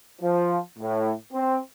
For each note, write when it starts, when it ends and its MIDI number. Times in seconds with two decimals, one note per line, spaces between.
0.22 0.58 53
0.78 1.12 45
1.33 1.57 60